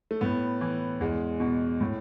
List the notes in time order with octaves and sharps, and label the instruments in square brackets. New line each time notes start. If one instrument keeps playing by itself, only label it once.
[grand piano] A3
A2 B3
E3
E2 G#3
B2
A2